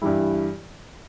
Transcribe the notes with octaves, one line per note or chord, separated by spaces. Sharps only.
G2 E3 G3 E4